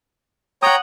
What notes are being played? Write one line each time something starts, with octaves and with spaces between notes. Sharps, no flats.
C#5 F#5 G5 A#5 D#6